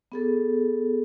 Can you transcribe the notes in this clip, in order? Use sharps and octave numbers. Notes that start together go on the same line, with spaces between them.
B3 G#4 A4